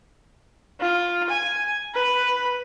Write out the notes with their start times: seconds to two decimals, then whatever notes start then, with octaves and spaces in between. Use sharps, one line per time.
0.80 F4
1.29 G#5
1.94 B4